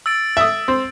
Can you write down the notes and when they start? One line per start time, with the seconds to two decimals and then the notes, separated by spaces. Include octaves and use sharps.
0.06 E6 A6 D7
0.37 E5 D#6
0.68 C4